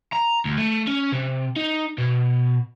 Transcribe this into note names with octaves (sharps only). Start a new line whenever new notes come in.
A#5
D2
A3
C#4
C3
D#4
B2